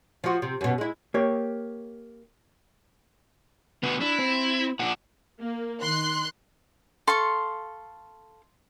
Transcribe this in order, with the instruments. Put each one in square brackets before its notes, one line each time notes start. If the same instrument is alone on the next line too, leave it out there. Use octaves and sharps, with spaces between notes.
[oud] F3 F#4
C3
F#2 B2
G#3 E4
[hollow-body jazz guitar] A#3 G4 C#5
[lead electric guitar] D2 B2 [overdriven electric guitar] B3
[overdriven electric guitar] D4 [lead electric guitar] E4
[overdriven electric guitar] C4
[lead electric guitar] A#2 D4 [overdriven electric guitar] F#5
[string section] A#3
D#3 C6 F#6
[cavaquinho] A4 F5 C#6 [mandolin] C6